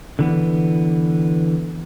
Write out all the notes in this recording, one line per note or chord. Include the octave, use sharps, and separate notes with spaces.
D3 E3 B3